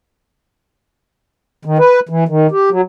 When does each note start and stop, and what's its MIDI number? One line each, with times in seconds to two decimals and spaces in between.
1.65 1.78 51
1.79 2.00 71
2.09 2.24 52
2.29 2.47 51
2.51 2.70 67
2.71 2.81 54